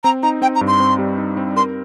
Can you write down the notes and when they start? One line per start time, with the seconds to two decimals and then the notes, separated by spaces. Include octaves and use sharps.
0.04 C4 A#5
0.23 D#4 A#5
0.42 C4 G5
0.55 A#5
0.61 G2
0.67 C6
0.80 C4
0.99 G3
1.18 D#4
1.37 C4
1.56 A#4 C6